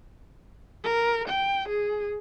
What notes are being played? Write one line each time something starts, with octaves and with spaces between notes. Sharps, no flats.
A#4
G5
G#4